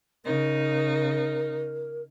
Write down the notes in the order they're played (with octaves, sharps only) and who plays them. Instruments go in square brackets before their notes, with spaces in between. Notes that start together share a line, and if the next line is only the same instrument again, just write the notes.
[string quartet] C#3 D#4 [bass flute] A#4